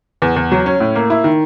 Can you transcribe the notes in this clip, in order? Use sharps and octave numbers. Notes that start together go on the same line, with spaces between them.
E2
E2
F#3
C#4
A2
A#3
E4
D#3